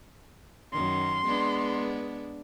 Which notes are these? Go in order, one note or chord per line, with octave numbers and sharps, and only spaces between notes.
F#2 D#3 C6
G#3 B3 D4